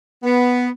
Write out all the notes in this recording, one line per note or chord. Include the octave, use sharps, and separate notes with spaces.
B3